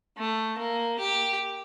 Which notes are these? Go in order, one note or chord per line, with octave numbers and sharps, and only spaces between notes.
A3
A#3
G4